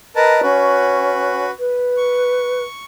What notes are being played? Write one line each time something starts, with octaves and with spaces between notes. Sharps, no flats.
A#4 B4 D#5 A5
C#4 F#4 B4
B4
C#6